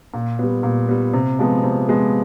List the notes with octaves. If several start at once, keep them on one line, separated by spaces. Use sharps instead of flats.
A#2
G3 B3
A#2
G3 B3
C3
F3 G#3 B3
C3
F3 G#3 B3